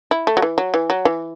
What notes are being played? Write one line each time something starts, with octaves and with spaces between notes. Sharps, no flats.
E4
A3
F#3
E3
F#3
E3
F#3
E3